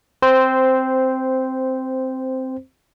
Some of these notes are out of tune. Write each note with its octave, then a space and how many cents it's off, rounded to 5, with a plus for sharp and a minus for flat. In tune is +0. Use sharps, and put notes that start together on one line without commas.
C4 +0 C5 -10